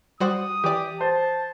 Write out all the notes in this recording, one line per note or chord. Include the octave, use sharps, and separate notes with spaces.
G3 F#4 C5 D#6
E3 G4 D5
C5 A5